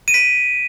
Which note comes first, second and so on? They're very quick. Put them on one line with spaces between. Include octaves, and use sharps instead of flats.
D#7 D7 B6